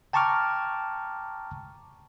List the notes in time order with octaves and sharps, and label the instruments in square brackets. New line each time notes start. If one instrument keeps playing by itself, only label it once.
[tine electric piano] G5 A5 A#5 C#6 D6 F6